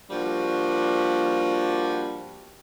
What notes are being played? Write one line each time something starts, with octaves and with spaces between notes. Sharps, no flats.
F3 G3 A#3 D4 F#4 G4